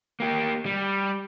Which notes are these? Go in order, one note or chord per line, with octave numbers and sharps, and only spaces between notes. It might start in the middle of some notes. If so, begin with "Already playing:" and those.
A#3 G4
G3